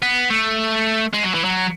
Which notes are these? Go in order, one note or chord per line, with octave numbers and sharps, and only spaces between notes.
B3
A3
G#3
F#3
E3
F#3